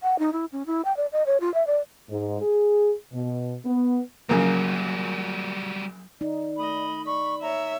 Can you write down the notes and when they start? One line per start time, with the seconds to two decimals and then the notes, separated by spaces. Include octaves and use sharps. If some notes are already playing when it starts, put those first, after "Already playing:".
0.03 F#5
0.19 D#4
0.33 E4
0.52 C#4
0.66 E4
0.85 G5
0.97 D5
1.12 D#5
1.26 C#5
1.41 F4
1.54 E5
1.67 D5
2.09 G#2
2.41 G#4
3.13 B2
3.65 B3
4.29 A#1 C#3 F#3 G3 A#3 F#4 A#4
6.21 D#4 D5
6.56 A3 D#5 B5
7.06 D5 B5 C#6
7.42 C#5 E5 A#5